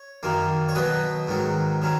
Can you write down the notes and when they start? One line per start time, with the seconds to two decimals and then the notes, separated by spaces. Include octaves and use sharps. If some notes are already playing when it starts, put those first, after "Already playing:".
Already playing: C#5
0.23 F#2 D#3 A#3
0.69 C#5
0.75 B2 F#3 B3 B4 D#5
1.28 G#2 D#3 F#3
1.82 D#3 F#3 C#4